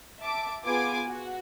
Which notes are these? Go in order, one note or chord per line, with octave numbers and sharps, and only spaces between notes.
E5 A5 D6
B3 F4 G#4 G#5 D6
F#4